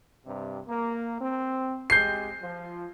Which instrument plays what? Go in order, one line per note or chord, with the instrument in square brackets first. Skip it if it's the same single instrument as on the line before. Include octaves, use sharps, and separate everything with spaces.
[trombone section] G2 C3
A#3
C4
[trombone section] G#3 C4 G4 [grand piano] G6 C7
[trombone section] F3